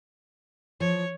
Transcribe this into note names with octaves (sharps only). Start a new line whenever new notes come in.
F3 C#5